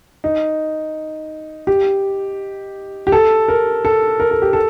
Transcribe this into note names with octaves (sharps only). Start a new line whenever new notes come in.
D#4
G4
G4
A4
A#4
A4
A#4
A4
G4
A4